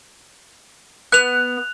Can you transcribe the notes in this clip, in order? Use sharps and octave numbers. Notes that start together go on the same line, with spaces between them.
B3 F#6 F7